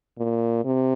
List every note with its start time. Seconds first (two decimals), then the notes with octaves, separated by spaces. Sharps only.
0.18 A#2
0.65 C3